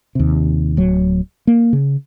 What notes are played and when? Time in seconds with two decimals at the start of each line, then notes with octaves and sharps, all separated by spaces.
0.15 D#2 C3
0.77 D1 F#3
1.47 A#3
1.73 C#3